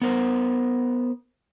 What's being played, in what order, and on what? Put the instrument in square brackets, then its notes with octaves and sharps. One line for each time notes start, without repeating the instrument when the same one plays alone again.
[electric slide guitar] B3 A#4 C5